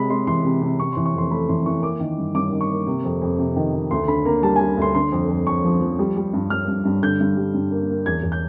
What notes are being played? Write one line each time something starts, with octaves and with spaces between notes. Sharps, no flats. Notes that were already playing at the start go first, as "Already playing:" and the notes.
Already playing: C3 G#3 B5
G#3 C6
E3 C6
C3
C3
C3 C#6
E3 C6
C#6
F2 C6
A3 B5
E3 C6
E3 C#6
A#3 D6
D#3
G2
G2 D6
D#3
C#6
A#3
C3
F2
F2
C3
D#3
D#3
D2 C6
D3 B5
A#3 A#5
G3 A5
G3 G#5
D2 C6
D3 C6
F2
F2
F2 C#6
F3
F3
G3
G3
G2
G2 F6
G2
G2
D3 G6
G2
G3
G2
A#3
A#3
E2 G#6
E2
G6